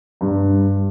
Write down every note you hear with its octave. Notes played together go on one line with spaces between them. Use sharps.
G2